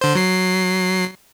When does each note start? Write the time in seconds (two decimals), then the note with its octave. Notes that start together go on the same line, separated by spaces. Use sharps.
0.01 D3 C5
0.15 F#3 C7